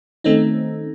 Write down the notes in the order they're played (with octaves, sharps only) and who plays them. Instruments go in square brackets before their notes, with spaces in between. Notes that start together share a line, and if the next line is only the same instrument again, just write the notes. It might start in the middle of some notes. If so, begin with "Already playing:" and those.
[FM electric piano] D#3 A3 C4 C#4 D#4